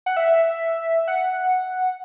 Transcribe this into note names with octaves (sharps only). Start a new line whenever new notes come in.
F#5
E5
F#5